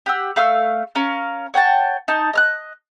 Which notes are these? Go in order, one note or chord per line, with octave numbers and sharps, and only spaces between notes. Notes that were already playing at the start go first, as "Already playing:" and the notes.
G4 F#5 E6
A3 F5 E6 F6
C#4 A#4 F5
C#5 F#5 G5 A5
D#4 A5
D#5 F6 F#6